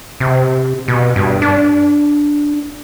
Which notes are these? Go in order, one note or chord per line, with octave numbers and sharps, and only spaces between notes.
C3
B2
G2
D4